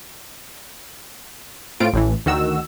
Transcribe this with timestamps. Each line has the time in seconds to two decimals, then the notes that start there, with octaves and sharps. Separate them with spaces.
1.80 A2 A3 C4 F4 D7
1.93 A1 A2 E3
2.26 D2 D#3 F#4 E6